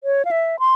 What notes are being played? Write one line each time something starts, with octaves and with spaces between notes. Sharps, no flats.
C#5
F5
E5
C6